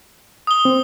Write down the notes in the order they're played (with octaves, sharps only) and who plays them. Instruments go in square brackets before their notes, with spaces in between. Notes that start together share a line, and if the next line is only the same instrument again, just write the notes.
[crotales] D#6 G7
[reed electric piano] C4